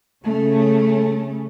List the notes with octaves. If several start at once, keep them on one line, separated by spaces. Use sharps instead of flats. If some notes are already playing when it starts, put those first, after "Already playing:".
C#3 A3 C#4